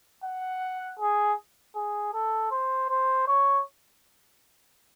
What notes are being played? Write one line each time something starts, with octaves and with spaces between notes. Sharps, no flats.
F#5
G#4
G#4
A4
C5
C5
C#5